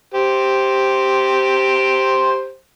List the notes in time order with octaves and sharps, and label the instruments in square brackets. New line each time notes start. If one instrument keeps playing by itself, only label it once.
[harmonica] G4 C5